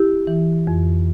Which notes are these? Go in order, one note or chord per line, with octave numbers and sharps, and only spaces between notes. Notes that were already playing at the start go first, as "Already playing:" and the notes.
Already playing: E4 G4
E3
F2